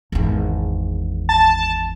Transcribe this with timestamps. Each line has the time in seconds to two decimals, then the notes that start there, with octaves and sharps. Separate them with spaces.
0.12 G#1 E2
1.29 A5